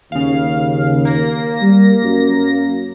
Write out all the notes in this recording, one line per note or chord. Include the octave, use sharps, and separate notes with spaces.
D#2 C#3 F5
A#3 A#6
G3
F#2